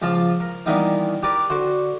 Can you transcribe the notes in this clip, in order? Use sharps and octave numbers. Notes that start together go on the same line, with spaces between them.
C#2 F3 F4 A5
A#4
D#3 E3 G3 A#3 B3 D#4
G4 A#4 B4 D5
D3 F#4 C5